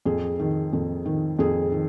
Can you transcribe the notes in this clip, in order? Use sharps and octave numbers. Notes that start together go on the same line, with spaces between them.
F2 G#4
D#3
F2
D#3
F2 G#4
D#3